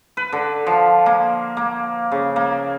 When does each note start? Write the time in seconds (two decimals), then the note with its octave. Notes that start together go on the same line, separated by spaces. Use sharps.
0.17 B4
0.32 D3
0.67 F3
1.06 A#3
1.57 A#3
2.12 C#3
2.36 A#3